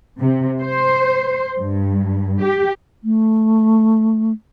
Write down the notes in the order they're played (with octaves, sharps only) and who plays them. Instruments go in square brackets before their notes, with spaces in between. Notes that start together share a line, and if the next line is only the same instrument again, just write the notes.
[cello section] C3
C5
G2
G4
[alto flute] A3